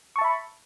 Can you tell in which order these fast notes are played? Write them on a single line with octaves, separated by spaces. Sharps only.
C#6 A5 E5 B5